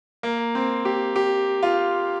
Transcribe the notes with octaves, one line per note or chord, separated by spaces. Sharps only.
A#3
C4
G4
G4
F4